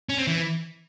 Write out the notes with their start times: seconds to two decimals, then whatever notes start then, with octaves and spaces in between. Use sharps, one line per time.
0.09 C#4
0.18 C4
0.27 E3